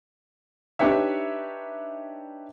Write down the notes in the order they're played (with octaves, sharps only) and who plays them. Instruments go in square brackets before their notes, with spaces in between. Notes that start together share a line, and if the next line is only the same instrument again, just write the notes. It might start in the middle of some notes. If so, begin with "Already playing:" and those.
[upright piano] D4 D#4 G4 B4 C#5 E5